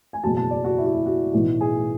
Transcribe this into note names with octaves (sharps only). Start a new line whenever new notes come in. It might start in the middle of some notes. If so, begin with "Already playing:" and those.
G#5
F#1 E2 B2 F#3 A5
A5
D5
F#4
E4
F#4
E4
F#4
B1 A2 E3 F#4
G#4